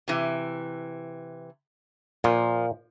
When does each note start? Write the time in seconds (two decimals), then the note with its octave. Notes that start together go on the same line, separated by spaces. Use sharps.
0.08 C3 E3
2.24 A#2 F3